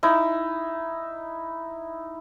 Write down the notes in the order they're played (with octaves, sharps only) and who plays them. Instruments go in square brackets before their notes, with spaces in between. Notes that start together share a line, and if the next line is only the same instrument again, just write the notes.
[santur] D#4 E4